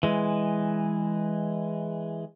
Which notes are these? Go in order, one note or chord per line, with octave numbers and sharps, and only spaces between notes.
E3 G#3